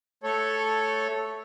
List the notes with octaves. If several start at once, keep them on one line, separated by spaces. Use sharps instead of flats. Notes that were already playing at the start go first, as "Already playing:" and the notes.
A3 A4 C#5